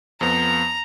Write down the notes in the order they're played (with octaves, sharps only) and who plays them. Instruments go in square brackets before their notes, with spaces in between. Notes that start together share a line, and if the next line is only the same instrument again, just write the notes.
[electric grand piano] F2 F3 B3 [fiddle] A#5